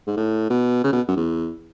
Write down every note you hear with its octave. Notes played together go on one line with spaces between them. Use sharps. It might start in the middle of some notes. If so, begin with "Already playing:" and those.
G#2
A2
B2
C#3
B2
F#2
E2